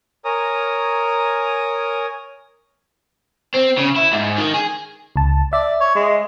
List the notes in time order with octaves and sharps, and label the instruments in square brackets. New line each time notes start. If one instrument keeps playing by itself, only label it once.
[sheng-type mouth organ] A#4 C#5 G#5 A#5 D#6
[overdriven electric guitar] C4
C#3
E4
G#2
D#3
G#4
[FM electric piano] C#2 A5
[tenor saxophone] D5 [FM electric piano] E5
[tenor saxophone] C#5
G#3